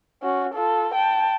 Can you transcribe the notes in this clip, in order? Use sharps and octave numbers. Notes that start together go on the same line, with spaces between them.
C#4 F#4
F4 A4
G5 A5